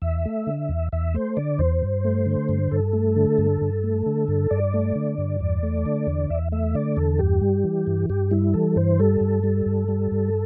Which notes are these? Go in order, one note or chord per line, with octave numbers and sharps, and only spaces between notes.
E2 E5
A3
D3
E2
E2 E5
A3 C5
D3 D5
E2 C5
G2
A3
D3
G2
G2 A4
A3
D3
G2
G2
A3
D3
G2
G2 D5
A3
D3
G2
E2
A3
D3
E2
E2 E5
A3 E5
D3 D5
E2 A4
G2 G4
G3
E3
G2
G2 G4
G3 E4
E3 A4
G2 C5
G3 A4
G2
G3
G2
G3
G2